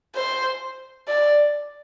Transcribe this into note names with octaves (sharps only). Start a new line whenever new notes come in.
C5
D5